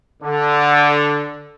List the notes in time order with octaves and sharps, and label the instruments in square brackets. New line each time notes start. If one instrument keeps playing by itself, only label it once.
[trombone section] D3